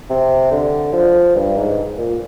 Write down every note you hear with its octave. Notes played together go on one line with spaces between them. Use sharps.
C3
D3
F3
G2
G#2
A#2